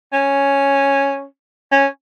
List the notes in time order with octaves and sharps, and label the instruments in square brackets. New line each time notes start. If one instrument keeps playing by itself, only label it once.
[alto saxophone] C#4
C#4